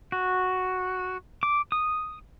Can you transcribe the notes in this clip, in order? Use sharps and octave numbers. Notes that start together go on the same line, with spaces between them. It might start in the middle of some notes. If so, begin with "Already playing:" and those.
F#4
D6
D#6